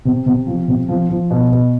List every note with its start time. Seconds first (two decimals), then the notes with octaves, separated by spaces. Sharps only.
0.05 C3
0.26 C3
0.47 F3
0.68 C3
0.89 F3
1.09 F3
1.31 B2
1.52 B2